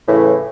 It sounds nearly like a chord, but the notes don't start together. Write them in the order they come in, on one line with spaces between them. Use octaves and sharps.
E3 A2 C#3